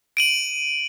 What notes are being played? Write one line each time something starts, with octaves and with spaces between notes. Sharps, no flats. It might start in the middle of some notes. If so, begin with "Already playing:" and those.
D7 D#7 F#7